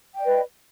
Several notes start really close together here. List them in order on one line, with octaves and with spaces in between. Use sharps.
G5 D5 D#5 B4